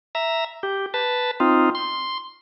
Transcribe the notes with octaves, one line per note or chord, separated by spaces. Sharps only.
E5 A#5
G4
B4 A5
C4 D#4 F4
C6